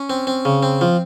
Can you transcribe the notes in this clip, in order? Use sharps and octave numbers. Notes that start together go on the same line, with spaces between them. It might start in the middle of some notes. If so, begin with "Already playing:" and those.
Already playing: C#4
C4
C4
C#3
C4
F3